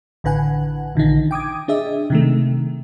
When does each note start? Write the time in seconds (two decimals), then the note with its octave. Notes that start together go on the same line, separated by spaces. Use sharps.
0.24 A1 D3 B4 F#5 G#5
0.95 A#1 D3 D#3 D#4
1.31 G5 D6 D#6 G#6
1.68 D4 G#4 D#5 E5
2.10 C3 D#3 A3